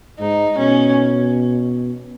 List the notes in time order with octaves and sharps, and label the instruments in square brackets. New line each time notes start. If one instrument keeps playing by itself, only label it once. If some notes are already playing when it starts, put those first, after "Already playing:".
[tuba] G#2 [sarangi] D#4
[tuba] B2 [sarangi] C#4